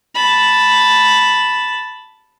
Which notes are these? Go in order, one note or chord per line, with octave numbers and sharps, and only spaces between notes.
A5 B5